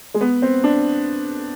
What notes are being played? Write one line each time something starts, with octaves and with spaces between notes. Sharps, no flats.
G#3
B3
C4
D4